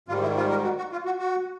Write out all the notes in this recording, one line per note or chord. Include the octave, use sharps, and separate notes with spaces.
G#2 D#3 G3 F4
E4
F4
A#4
F#4
F#4
F4
F#4
F#4